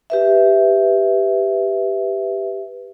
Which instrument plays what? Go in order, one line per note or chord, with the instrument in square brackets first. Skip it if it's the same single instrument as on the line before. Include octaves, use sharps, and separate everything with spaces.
[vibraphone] G4 B4 E5